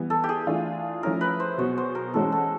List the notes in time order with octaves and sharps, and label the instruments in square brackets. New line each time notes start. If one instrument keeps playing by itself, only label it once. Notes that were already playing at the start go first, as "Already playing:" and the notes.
Already playing: [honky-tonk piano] E3 G3 B3
[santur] A4
G4
G#4
[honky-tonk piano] E3 A3 D4 F4
[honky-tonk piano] F3 A3 C#4 E4 [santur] A#4
[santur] B4
C5
[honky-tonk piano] B2 F#3 B3 [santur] C#5
[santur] C5
A#4
[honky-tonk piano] E3 G#3 C#4 F#4 [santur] A4
[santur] A4